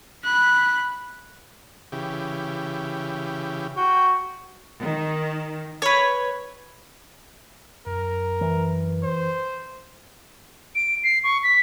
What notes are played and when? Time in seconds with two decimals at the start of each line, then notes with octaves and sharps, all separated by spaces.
0.25 B5 F#6
1.92 C#3 E3 G4
3.77 F#4 G5
4.81 D#3
5.82 B4 C#5
7.87 F#2 A#4
8.41 E3
9.03 C5
10.75 D7
11.04 C7
11.24 C#6
11.43 B6